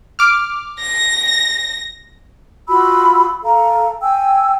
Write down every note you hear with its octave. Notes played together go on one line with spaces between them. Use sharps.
D6 F6
A#6
F4 F#4 B5 E6
A4 F5 A#5
G5 G#5 E6